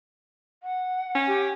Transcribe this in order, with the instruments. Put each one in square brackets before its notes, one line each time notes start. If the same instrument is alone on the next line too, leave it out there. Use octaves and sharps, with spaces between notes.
[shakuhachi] F#5
[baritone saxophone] C#4
[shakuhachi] G4